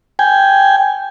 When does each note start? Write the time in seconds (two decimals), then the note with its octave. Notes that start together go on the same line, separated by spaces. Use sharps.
0.19 G5 G#5